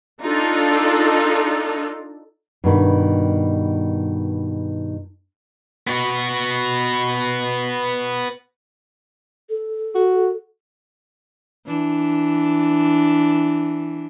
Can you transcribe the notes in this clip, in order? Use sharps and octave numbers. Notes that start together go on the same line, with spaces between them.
D4 D#4 F4 A4
G2 B2 D#3
B3 F#4
A4
F#4
E3 D4